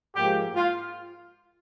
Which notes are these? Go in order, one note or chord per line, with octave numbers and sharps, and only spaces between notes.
G#2 F3 A#3 G4
F4